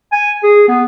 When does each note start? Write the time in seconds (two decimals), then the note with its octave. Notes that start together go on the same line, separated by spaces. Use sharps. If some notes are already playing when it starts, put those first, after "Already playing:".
0.12 G#5
0.43 G#4
0.68 B3